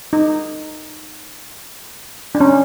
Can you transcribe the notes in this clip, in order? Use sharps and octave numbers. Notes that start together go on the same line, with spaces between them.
D#4
D4
C#4